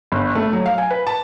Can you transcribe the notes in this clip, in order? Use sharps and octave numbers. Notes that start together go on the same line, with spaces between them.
G1
A3
F#3
F5
G#5
B4
A5